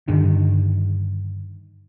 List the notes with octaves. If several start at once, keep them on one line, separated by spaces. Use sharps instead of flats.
G2 D3 D#3